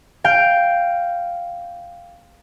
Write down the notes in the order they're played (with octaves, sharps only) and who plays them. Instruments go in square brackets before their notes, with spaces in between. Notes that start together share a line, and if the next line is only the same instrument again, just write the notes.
[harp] F5 G5